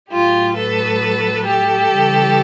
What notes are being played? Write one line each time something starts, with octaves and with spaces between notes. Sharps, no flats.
A2 F#3 F4 G4
A4 B4
G4 A4
C#3 E3 G3